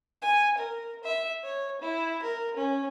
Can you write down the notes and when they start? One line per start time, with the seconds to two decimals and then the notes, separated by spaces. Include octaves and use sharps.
0.22 G#5
0.58 A#4
1.04 E5
1.43 C#5
1.81 E4
2.22 A#4
2.56 C#4